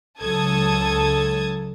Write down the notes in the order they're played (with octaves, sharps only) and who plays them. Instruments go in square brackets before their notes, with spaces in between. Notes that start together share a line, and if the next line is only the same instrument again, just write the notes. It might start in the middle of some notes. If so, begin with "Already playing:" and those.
[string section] C#2 F#3 A4 A5 D#6 G#6